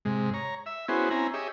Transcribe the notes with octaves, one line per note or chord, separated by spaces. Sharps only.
G#2 C3 G#3
C#5 A#5
E5
B3 C#4 E4 F#4 G#4 C5
C4 C#4 E4 G#5 A#5
G4 G#4 C#5 D#5 E5